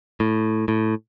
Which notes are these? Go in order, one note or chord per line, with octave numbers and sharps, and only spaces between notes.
A2
A2